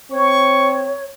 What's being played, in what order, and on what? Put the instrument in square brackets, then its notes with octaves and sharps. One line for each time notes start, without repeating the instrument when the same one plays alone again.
[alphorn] C4 [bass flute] C#5 [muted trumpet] C#6